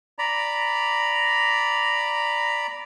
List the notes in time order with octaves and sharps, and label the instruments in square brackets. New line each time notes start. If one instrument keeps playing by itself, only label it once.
[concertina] D5 A#5 B5